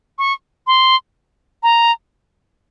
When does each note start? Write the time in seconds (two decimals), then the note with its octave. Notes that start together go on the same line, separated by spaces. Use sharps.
0.18 C#6
0.67 C6
1.63 A#5